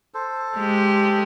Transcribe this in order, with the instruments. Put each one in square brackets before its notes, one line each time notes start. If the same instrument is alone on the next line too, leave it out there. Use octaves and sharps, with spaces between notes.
[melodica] A4 C5
[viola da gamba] G#3 G4